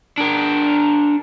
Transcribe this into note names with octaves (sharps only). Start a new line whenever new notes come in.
D4 A#4